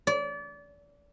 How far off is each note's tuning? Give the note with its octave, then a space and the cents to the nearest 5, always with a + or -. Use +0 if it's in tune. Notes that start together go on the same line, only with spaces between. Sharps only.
D5 -30